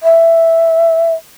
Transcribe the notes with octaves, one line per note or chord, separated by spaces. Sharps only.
E5